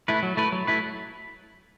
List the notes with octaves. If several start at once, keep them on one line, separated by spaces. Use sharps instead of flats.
A3 E4 B4
F#3
A3 E4 B4
F#3
A3 E4 B4